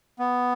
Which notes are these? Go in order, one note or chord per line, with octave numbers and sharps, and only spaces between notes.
B3